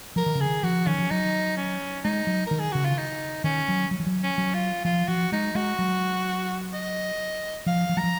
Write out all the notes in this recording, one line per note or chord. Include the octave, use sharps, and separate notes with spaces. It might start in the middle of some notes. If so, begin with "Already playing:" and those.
F3 A#4
D#3
C#3
G#4
D#3
F3 F#4
D#3 C#4
F3
F#3 D#4
C#4
G#3 D#4
F#3
D#3 A#4
G#4
C#3 F#4
F4
D#4
D#3 C#4
F#3
F#3
F3
F#3
C#4
F#3
F4
F3 F4
F3 F#4
G#3 D#4
G#3 F#4
F#3
D#5
F3 F5
F3
F#3 A#5
F3